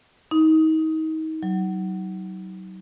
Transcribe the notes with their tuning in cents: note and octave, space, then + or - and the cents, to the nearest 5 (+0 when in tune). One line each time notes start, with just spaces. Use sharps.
D#4 +30
F#3 +30